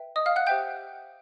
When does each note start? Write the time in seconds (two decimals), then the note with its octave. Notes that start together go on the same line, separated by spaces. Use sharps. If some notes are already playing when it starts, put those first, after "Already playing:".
Already playing: B4 E5 G5
0.16 D#5 D#6
0.26 F5 F6
0.36 F#5 F#6
0.47 G4 C5 E5 G5 G6